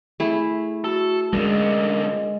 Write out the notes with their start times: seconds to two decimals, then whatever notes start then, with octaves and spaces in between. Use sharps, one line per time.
0.20 A3 E4 G#4
0.84 F#4 A4
1.33 C#2 D3 G#3 A#4